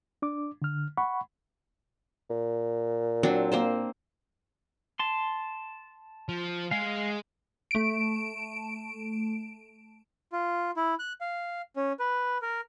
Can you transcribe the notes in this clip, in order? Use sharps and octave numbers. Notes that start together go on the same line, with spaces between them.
D4 D6
D3 F6
F#5 B5 C#6
A#2
F#3 C4 D4
A#3 C4 C5
A5 C6
F3
G#3 G#4 F5
A3 D7
F4
E4
F#6
F5
C#4
B4
A#4